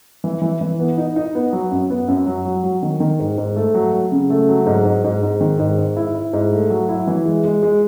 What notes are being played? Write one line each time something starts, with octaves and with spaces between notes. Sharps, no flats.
E3
E3
E3
B3
D#4
D#4
B3
F#3
F#2
B3
F#2
F#3
F#3
F#3
D#3
D#3
G#2
G#2
A3
F#3
F#3
C#3
A3
F#3
G#2
G#2
G#2
G#2
D#3
G#2
G#2
E4
E4
G#2
A3
F#3
E4
E3
G#3
G#3
G#3